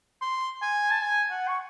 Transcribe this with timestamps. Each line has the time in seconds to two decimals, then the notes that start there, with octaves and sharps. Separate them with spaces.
0.21 C6
0.62 G#5
0.90 A5
1.02 G#5
1.30 F#5
1.48 C#6